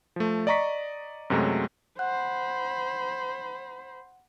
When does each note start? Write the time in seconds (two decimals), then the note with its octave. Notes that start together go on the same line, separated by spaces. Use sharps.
0.16 F3 A3
0.47 D5 D#5 A#5 C#6 B6
1.30 F#2 C3 F#3 G#3 A3
1.99 C5 F#5 B5 F#6